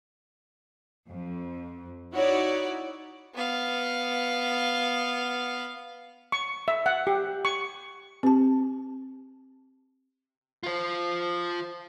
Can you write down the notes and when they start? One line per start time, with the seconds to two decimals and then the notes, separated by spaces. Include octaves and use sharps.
1.08 F2
2.12 D#4 E4 F#4 C#5 D5
3.35 B3 F5
6.32 C#6
6.68 E5
6.86 F#5
7.07 G4
7.45 C#6
8.23 C4 G4 A5
10.63 F4 C5